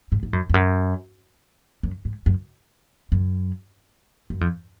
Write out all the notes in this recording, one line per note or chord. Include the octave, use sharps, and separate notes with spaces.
G#2
G#2
F#2
F2
F#2
F#2
G#2
F#2
F#2
F#2
F2